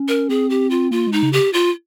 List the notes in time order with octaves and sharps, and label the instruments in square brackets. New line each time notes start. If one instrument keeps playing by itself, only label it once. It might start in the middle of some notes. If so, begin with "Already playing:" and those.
Already playing: [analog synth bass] C#4
[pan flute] A#4
[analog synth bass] C4 [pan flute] G#4
[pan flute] G4
F4
[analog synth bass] A#3 [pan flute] F4
[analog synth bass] G#3
[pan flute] D#4
[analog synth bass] C#3
[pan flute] G4
F4